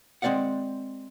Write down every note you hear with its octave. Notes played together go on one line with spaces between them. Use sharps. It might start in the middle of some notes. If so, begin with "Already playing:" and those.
G#3 C4 D4 D5 F5 F#5